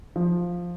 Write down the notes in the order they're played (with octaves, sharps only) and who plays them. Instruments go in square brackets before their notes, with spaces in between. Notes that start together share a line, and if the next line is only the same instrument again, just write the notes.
[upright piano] F3